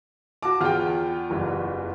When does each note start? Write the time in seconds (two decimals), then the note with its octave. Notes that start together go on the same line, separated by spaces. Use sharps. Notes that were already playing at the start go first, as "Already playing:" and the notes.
0.43 F#4 A5 D6
0.61 E2 F4 F#5 G5 F6
1.30 F#1 E3 G3